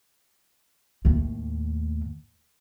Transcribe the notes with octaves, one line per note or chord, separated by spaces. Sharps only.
D#2 A2